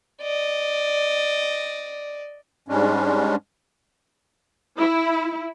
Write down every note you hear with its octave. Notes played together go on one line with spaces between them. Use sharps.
D5 D#5
G#2 G3 G#3 C#4 D4
E4